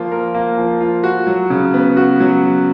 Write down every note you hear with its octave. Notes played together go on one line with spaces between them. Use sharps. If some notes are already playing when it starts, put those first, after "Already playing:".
Already playing: F3 A#3 F4 A#4
A#4
A#3
F3
F4
F#4
F#3
C#3
B3
F#4
F#3